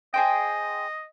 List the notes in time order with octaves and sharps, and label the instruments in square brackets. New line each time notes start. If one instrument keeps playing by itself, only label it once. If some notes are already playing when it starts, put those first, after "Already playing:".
[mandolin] G#4 C5 G5 [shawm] D#5